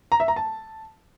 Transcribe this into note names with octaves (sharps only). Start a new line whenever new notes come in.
A#5
E5
A#5
A5